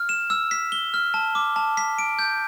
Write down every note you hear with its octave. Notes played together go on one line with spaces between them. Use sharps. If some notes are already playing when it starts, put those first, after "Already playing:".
Already playing: F6
E7
E6
B6
G7
F6
A5
D6
A5
B6
D7
G6